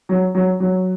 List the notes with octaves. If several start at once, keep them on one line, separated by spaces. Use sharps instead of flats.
F#3
F#3
F#3